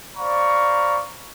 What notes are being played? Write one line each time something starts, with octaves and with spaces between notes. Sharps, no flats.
C5 D5 F5 A#5 B5 C#6